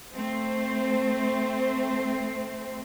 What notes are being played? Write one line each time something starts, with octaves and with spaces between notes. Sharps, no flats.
A3 C4 C5